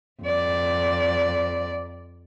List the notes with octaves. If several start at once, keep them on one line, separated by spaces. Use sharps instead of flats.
F2 D5